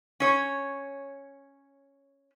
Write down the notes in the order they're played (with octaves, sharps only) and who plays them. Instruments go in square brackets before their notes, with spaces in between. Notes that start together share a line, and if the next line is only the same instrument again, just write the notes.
[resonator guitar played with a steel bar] C#4 C#5